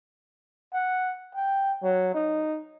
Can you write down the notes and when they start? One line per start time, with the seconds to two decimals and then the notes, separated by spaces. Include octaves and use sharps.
0.74 F#5
1.35 G5
1.83 F#3
2.14 D#4